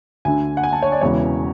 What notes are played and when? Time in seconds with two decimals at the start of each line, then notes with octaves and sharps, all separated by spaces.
0.25 D2 D3 G#5
0.57 F#5
0.63 G#5
0.73 A5
0.83 C#5
0.92 D5
1.01 E1 E2 C#3 E3 C#5